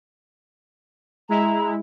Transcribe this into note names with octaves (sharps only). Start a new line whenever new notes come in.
G#3 E4 A#5